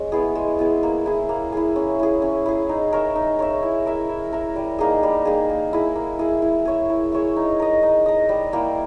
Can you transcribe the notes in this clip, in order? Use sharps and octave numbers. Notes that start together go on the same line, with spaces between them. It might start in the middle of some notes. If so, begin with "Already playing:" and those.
Already playing: G#3 C#4
B3 E4 G#4
G#3
B3 E4 G#4
A#3
E4 G#4
A#3
E4 G#4
C#4
E4 G#4
C#4
E4 G#4
D#4
A#4 C#5 E5
D#4
A#4 C#5 E5
E4
A#4 E5
E4
A#4 E5
G3
A#3 D#4 G#4
G3
A#3 D#4 G#4
A#3
E4 G#4
A#3
E4 G#4
E4
G#4 C#5 E5
E4
G#4 C#5 E5
D#4
A#4 D#5
D#4
A#4 D#5
G3
A#3 E4 G4